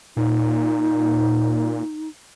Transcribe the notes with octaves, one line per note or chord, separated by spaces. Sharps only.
A#2 D#4